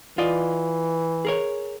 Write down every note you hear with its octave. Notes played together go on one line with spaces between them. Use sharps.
E3 F4 D5 D#5
G#4 A#4 C#5